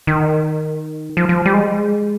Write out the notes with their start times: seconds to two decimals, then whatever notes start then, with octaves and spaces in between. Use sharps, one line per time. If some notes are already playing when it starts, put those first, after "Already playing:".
0.07 D#3
1.17 F3
1.29 F3
1.45 G3
1.53 G#3